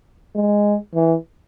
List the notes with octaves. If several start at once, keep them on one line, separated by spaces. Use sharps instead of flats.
G#3
E3